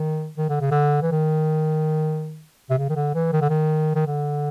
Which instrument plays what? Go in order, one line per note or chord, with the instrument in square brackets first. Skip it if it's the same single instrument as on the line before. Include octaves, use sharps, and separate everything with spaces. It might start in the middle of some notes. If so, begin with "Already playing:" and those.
Already playing: [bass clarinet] D#3
D#3
D3
C#3
D3
E3
D#3
C3
C#3
D#3
D3
E3
D#3
D3
D#3
D#3
D3